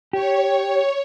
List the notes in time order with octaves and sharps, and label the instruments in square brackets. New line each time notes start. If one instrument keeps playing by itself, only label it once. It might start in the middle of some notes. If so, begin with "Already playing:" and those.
[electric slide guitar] G4 [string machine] C#5